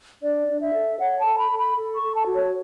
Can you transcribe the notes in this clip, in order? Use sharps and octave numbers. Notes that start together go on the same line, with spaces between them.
D4 D5
D4
E5
A4
C#5 F#5
A5
A4
B5
A4
B5
A4
C#6
A4
A5
F#4
C#5